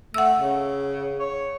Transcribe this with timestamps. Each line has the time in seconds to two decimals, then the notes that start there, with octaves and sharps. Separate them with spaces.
0.14 A3 F#5 E6
0.36 C#3
1.19 C#5